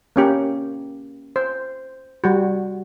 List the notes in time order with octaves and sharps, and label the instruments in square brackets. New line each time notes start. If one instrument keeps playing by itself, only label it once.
[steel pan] A#3 C#4 G4
C5
G3 F#4